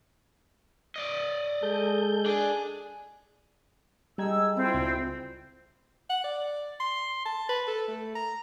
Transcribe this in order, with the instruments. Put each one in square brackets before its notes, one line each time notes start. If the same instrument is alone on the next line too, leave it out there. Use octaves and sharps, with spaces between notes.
[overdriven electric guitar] D5 D#5
[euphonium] G#3 [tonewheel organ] A4 G6
[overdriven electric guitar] D4 [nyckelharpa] G#4
[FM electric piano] G3 G5 G#6 [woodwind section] G#3 E6 [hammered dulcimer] D#4 G#4 A4
[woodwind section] D2 C4 [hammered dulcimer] E4 F4
[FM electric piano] C#2
[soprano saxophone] F#5
D5
C6
A5
B4
A4
A3
A#5